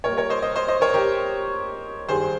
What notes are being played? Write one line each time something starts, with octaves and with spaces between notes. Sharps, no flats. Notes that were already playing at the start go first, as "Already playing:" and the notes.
A#2 G3 A#4 C#5
A#4 C#5
C5 D#5
C5 D#5
C5 D#5
C5 D#5
A#4 C#5
G4 A#4
G2 D#3 G3 G#4 C5